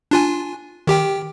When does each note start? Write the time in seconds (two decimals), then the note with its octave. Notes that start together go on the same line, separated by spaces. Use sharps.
0.11 D4 F4 G#5
0.87 D#3 G4 G5